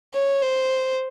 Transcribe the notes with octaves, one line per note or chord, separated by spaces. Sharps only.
C#5
C5